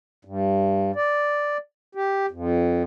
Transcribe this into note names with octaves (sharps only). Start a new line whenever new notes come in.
G2
D5
G4
F2